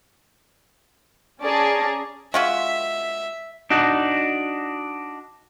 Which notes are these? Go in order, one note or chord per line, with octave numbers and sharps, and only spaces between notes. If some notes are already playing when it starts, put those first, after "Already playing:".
C#4 G#4 D5 A5 A#5
G#3 F4 F#4 E5
D4 D#4 F#4